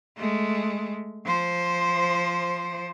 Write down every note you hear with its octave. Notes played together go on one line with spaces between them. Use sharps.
G#3 A3
F3 C5